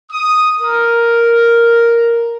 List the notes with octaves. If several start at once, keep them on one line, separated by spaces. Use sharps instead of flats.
D#6
A#4